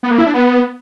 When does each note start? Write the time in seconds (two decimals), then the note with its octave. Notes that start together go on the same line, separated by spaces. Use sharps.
0.03 B3
0.11 A#3
0.18 E4
0.26 D4
0.34 B3